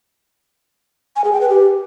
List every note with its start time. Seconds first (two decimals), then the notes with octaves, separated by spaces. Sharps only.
1.16 G#5
1.24 G#4
1.33 G5
1.41 B4
1.49 G4